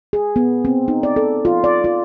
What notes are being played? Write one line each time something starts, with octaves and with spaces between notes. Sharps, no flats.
G#4
B3
C4
D#4
D5
A4
F4
D5
F4